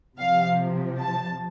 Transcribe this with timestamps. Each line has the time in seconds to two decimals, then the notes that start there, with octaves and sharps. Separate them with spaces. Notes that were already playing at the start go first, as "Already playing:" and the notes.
0.17 C3 F3 F5
1.00 A5